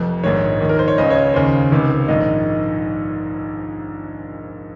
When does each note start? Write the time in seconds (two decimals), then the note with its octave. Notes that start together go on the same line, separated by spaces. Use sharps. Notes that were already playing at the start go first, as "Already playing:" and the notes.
Already playing: F1 F2
0.23 A#1 G#2 D#3 C#5
0.60 D#2 D#3
0.69 A#4
0.79 C5
0.88 C#5
0.98 C#2 C#3 D#5
1.10 C#5
1.34 D#2 C#3 C5
1.71 C#2 C3 D#3
2.08 A#1 G#2 D#3 D#5